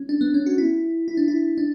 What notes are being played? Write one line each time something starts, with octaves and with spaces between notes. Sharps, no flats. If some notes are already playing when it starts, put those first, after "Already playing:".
Already playing: C#4
D4
B3
C#4
F#4
E4
E4
D4
E4
D4